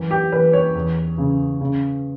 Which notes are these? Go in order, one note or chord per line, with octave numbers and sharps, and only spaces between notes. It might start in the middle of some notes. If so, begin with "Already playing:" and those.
Already playing: F#2 E3
G4
E3 B4
C#5
E2
C#3
C#3